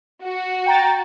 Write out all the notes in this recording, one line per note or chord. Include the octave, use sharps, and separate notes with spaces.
F#4
G5 A#5 A6